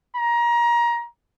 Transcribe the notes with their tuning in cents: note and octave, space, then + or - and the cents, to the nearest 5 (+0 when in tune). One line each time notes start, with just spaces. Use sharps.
A#5 +25